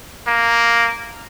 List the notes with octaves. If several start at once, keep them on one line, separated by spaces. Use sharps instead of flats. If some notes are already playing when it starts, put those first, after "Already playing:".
A#3